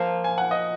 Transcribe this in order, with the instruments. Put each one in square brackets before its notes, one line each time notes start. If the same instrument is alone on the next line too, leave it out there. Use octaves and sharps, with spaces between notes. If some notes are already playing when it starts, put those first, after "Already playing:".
Already playing: [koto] F3 A#3 F4
[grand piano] G#5
F#5
D#5